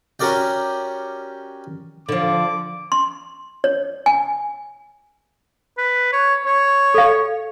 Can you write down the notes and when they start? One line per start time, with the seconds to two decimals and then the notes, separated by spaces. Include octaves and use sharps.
0.20 C#4 F#4 G4 A#4 D5 G5
2.09 D3 F3 D6
2.92 C6
3.64 C#5
4.06 G#5
5.78 B4
6.13 C#5
6.46 C#5
6.94 A4 F5